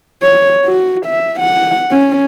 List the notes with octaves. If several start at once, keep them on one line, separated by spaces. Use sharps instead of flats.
C#5
F#4
E5
F#5
C#4